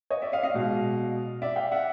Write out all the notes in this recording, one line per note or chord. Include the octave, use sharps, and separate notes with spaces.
C#5 D#5
D5 E5
D#5 F5
D#5 F5
B2 G#3
D5 E5
F5 G5
E5 F#5